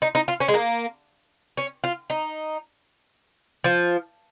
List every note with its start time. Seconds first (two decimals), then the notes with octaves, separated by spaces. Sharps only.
0.02 D#4
0.15 D#4
0.28 F4
0.40 C#4
0.48 G#3
0.54 A#3
1.57 C#4
1.84 F4
2.10 D#4
3.64 F3